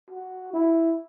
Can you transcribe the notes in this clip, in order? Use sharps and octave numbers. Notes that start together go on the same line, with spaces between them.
F#4
E4